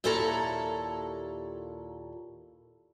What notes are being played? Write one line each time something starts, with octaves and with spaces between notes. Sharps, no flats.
D#2 A#2 E4 A4 C#5 A#5